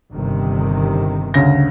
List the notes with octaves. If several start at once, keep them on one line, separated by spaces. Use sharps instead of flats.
G1 C3 D#3
D2 C#3 A#6